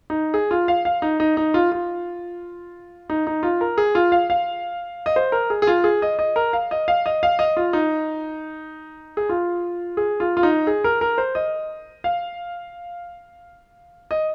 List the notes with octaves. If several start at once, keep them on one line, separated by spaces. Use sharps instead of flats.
D#4
G#4
F4
F5
F5
D#4
D#4
D#4
F4
F4
D#4
D#4
F4
A#4
G#4
F4
F5
F5
D#5
C5
A#4
G#4
G#4
F4
G#4
D#5
D#5
A#4
F5
D#5
F5
D#5
F5
D#5
F4
D#4
G#4
F4
G#4
F4
F4
D#4
G#4
A#4
A#4
C5
D#5
F5
D#5